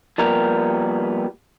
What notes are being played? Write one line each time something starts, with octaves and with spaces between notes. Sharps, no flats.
F3 G3 A#3 B3 G4 A#4